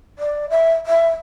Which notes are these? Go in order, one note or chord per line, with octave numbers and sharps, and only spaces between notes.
D5
E5
E5